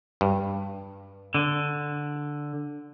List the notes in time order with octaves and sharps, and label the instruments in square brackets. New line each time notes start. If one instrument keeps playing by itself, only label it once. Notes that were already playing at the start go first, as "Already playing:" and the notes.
[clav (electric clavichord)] G2
[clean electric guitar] D3